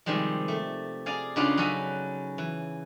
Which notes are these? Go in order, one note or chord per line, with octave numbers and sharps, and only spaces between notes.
C3 D#3 F3 G3 G#3
A3
G#4 A#4 D5 F5 G#5
C#3 B3 D4 D#4 F4 G#4
F#3 C#4 A4 B4 G#5 B5
E3